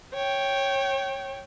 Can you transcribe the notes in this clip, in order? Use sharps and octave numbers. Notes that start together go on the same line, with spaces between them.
C#5 G5